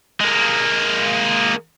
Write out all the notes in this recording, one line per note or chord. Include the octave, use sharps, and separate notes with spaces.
G#3 A#3